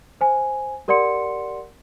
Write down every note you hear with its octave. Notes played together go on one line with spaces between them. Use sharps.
C5 G#5
G4 A#4 D5 F#5 C6 C#7